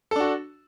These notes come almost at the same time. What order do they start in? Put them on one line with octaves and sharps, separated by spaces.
A4 D4 F#4